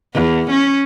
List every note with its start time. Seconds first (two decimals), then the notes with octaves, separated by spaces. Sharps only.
0.14 E2
0.51 C#4